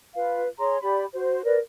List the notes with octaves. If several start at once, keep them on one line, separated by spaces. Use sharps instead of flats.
F4 B4 F5
G#4 C#5 A#5 C6
G4 D5 B5
F#4 C5
A#4 B4 D5